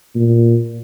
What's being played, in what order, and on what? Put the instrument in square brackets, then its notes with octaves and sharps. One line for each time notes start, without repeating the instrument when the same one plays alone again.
[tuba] A#2